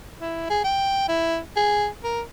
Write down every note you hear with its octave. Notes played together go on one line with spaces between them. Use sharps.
E4
G#4
G5
E4
G#4
A#4